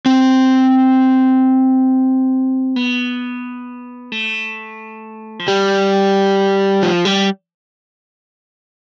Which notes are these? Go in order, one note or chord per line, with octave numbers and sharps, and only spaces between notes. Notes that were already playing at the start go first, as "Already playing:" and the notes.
C4
B3
A3
F3
G3
F3
G3